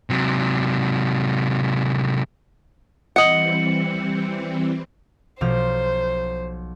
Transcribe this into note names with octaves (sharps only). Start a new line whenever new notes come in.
C3 F#3
E3 G3 C4 D#5 F#5 C#7 F#7
B1 F3 C5 F6